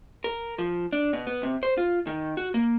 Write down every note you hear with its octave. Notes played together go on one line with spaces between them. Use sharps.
A#4
F3
D4
B2
B3
C3
C5
F4
D#3
F#4
A#3